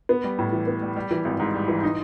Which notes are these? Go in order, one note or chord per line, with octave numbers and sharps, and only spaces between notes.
B3
G3
A2
E3
B3
G3
G3
E3
G#1
G#2
G3
E3
D#4